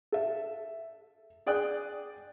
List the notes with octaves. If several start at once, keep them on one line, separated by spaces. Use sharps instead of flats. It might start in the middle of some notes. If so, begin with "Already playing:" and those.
A4 E5
G#4 D5 G5 D#6 F#6